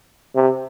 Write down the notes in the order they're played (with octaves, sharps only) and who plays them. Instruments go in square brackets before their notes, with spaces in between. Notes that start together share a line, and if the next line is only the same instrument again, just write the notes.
[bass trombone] C3